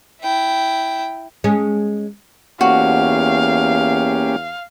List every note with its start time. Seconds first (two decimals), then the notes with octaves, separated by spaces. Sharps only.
0.22 E4 G5
1.44 G#3 C#4
2.61 E2 A#3 C#4 F#4 G4 F5